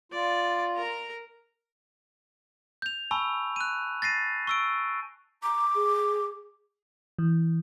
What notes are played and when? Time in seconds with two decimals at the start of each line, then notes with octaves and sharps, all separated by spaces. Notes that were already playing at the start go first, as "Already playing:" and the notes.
0.12 F4 D5
0.76 A#4 A#5
2.82 G6 F7
3.11 G#5 A5 B5 C#6 E6
3.56 F#6 D#7
4.02 A6 A#6 C7 D#7
4.47 C#6 E6 D7
5.43 A#5 D6
5.75 G#4
7.19 E3